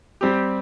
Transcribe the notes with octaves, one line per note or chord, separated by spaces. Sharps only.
G3 C4 G4